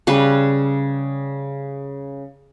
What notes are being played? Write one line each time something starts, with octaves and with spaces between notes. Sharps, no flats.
C#3 G3 B4